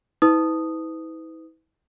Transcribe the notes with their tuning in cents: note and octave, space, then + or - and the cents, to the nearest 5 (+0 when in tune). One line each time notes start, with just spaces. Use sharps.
E4 -40 B4 +35 D#6 -10